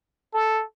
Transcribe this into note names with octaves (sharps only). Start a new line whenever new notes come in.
A4